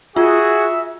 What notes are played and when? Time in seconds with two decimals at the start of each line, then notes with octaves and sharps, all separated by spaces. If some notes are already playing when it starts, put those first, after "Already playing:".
0.16 F4 F#4 G#4 E5